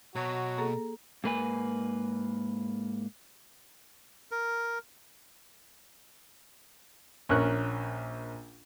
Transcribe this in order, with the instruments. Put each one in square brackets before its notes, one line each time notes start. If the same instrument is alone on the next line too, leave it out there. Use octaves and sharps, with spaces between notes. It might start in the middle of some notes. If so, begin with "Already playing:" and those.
[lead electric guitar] B2 [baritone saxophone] F#3 [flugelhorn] F#4
[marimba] A#3 G#4 A4
[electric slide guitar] G#2 A#3 B4 G#5
[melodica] A#4
[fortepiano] A#1 C#4 A#4 C#6 F#6